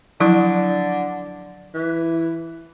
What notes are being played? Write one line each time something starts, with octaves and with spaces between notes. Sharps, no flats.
D3 F3 F#3 E4
E3